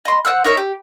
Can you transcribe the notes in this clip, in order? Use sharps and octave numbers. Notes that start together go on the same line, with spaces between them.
D#5 C6
C5 F#5 E6 F#6
D#4 A#4 C#5 E5
G4